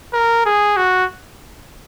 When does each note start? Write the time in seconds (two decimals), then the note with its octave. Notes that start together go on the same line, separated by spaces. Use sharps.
0.13 A#4
0.46 G#4
0.77 F#4